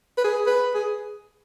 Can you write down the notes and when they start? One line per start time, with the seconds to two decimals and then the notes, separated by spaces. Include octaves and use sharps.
0.17 B4
0.24 G#4
0.46 B4
0.74 G#4